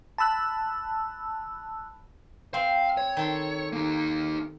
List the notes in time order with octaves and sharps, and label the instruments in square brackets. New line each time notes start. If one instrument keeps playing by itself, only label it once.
[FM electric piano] A5 B5 E6 F#6
[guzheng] C4 [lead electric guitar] F5
[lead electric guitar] C#5
[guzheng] D#3 A4 C6
[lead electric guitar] A#3 D#4